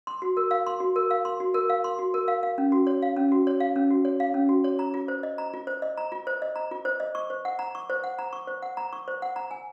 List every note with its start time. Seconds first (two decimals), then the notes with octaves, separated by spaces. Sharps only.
0.07 C6
0.22 F#4
0.37 A#4
0.51 F5
0.67 C6
0.80 F#4
0.96 A#4
1.11 F5
1.25 C6
1.40 F#4
1.54 A#4
1.70 F5
1.84 C6
1.99 F#4
2.14 A#4
2.28 F5
2.43 F5
2.58 C#4
2.72 F#4
2.87 C#5
3.02 F5
3.17 C#4
3.32 F#4
3.47 C#5
3.60 F5
3.76 C#4
3.91 F#4
4.05 C#5
4.20 F5
4.34 C#4
4.49 F#4
4.64 C#5
4.79 A#5
4.94 F4
5.08 C5
5.23 D#5
5.38 A#5
5.53 F4
5.67 C5
5.82 D#5
5.98 A#5
6.12 F4
6.27 C5
6.42 D#5
6.56 A#5
6.71 F4
6.85 C5
7.00 D#5
7.15 C#6
7.30 C5
7.45 F#5
7.59 A#5
7.75 C#6
7.90 C5
8.04 F#5
8.19 A#5
8.33 C#6
8.47 C5
8.62 F#5
8.77 A#5
8.93 C#6
9.08 C5
9.22 F#5
9.36 A#5
9.51 G#5